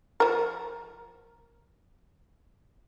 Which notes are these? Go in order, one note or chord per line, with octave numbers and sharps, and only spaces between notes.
F3 A#4